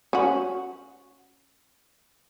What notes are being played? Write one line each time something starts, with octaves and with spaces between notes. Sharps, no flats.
C#4 F#4